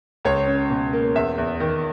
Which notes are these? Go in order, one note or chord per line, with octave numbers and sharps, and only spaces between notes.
C#2 C#5
C#4
B2
A#3
E2 E5
E2
D#3